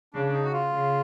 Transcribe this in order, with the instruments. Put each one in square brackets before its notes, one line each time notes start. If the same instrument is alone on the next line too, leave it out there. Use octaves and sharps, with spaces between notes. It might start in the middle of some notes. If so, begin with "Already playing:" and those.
[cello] C#3 [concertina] D4
[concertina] D4
D#4
F#4
F4
[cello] C#3